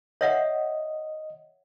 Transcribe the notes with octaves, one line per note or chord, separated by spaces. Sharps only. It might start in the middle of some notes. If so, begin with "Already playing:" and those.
C#5 D#5 E5 F#5